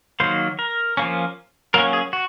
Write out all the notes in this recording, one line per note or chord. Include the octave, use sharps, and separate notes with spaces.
D#3 F#3 A#3 C5
A#4
F3 A#3 C#4
F#3 A#3 C#4 A#4
G#4
F#4